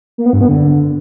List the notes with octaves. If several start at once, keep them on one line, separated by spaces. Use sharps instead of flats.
A#3
B3
G2
B3
D3